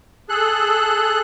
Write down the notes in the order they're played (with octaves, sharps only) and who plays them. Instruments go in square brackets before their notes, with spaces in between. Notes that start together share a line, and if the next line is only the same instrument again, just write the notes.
[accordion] G#4 A4 F#6